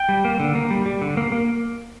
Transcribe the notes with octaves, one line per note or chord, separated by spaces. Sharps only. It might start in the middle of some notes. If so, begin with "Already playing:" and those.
Already playing: G5
G3
A#3
D3
A#3
G3
G3
D3
A#3
A#3